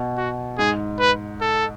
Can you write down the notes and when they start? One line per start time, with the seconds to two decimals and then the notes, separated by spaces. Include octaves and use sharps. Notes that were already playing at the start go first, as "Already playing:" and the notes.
Already playing: B2
0.17 F#4
0.58 G#2 G#4
0.99 B4
1.41 A4